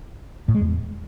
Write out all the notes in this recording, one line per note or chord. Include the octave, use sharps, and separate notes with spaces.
A2
G#3
E2